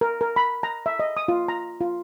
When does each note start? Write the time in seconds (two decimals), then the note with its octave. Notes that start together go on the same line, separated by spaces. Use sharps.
0.01 A#4
0.21 A#4
0.36 B5
0.63 A#5
0.86 E5
1.00 D#5
1.17 D#6
1.28 F4
1.48 A#5
1.81 F4